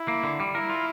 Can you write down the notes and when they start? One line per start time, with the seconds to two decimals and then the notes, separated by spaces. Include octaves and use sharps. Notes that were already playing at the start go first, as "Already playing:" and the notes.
Already playing: E4
0.08 A#3
0.24 D3
0.40 G3
0.55 E4 A#4
0.70 F4